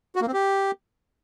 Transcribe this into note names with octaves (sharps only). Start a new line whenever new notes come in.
F#4
A#3
C4
G4